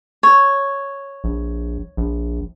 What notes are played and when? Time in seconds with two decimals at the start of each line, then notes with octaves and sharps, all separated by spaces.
0.23 C#5
1.24 A#1
1.97 A#1